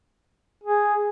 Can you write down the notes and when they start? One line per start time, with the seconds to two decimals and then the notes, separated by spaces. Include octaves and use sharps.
0.63 G#4